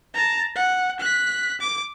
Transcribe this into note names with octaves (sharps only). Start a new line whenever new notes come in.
A5 A#5
F#5
F#6 B6
D6